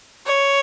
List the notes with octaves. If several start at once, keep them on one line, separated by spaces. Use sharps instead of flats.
C#5